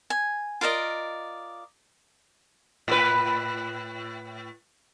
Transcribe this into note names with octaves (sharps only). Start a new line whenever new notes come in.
G#5
F4 A#4 D5 D#5
A2 B4